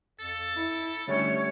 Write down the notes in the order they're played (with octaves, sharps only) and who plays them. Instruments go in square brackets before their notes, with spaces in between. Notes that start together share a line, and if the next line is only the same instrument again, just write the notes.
[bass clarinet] F2 [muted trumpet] A4
[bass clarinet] E4
[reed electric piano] D3 G3 C#4 [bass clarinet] A3 [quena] C#5